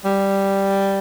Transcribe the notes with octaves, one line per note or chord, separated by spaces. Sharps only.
G3